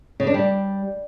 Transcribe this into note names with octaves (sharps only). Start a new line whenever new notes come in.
C#3
D4
G3